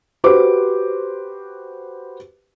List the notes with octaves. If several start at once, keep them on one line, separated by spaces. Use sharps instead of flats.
F#4 G4 B4 C5 D6